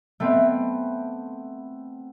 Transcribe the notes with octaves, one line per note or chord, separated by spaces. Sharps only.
A3 B3 C4